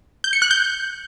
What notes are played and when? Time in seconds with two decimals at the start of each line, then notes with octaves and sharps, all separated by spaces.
0.24 G6
0.33 C#7
0.42 F#6
0.51 G6